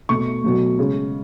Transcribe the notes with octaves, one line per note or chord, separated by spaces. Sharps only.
B2 A3 C#6
B2 F#3 A3
C#3 G#3